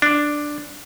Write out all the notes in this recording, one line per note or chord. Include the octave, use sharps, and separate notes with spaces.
D4